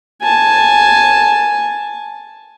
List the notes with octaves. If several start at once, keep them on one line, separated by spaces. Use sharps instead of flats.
G#5 A5